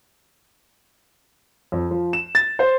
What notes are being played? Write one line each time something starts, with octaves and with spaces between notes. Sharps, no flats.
F2
F3
E7
A6
C5